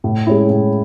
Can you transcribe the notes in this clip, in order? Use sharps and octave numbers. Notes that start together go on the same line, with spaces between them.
A2
G#3 C#4 E4
A2